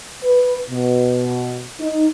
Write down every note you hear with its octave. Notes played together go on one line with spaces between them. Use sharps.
B4
B2
D#4